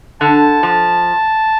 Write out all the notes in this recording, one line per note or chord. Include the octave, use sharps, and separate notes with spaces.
D3 A5
F3